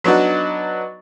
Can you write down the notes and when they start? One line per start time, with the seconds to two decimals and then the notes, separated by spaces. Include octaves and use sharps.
0.04 F#3 B3 D4 D#4 F#4